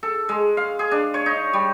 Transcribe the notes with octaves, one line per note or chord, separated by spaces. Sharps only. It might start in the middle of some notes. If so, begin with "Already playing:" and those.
A4
G#3
F5
G#4
D4
C#5
D#4
G3